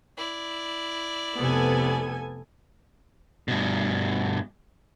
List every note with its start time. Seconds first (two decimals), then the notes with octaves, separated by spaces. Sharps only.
0.17 E4 D5
1.39 F1 C3 B3 A4 G#5
3.48 G2 B2